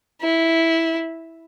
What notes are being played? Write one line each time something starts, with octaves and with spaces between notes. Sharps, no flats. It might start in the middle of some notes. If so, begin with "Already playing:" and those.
E4